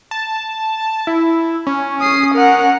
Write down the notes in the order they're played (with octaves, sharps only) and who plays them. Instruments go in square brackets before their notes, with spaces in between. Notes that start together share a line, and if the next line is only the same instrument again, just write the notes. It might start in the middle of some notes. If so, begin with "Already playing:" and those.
[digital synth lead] A5
E4
C#4
[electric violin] D#6 C7
A#4 F#5